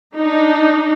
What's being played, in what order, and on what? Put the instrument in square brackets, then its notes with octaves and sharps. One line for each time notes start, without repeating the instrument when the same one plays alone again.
[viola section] D4 D#4